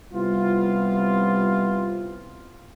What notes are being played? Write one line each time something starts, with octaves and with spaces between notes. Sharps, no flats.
C3 G3 B3 C4 E4 F4